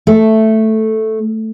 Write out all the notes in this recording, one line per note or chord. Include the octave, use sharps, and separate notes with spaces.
A3